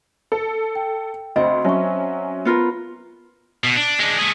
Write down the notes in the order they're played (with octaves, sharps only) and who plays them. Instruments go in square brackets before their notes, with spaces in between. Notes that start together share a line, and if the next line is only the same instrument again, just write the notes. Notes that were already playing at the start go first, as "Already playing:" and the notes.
[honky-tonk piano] A4
[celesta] G5
[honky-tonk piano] D2 [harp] C4 [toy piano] D#5 B5
[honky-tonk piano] F#3 C#4 [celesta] E5 C#6 [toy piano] A5
[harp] B3 F4 A#4
[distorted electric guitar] B2
D4
G#3 D4
A3 G#4